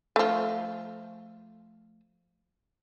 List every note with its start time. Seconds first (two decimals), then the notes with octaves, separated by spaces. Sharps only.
0.16 F3 A3